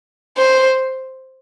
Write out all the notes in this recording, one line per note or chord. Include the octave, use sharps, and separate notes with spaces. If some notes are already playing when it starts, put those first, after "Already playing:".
C5